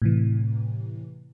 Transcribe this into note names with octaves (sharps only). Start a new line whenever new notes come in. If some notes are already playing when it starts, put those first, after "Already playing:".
A2 C3 E3